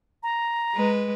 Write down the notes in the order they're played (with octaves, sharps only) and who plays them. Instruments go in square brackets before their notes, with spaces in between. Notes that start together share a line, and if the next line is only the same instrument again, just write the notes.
[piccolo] A#5
[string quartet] G#3 B4